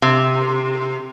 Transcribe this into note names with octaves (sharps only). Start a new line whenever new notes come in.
C3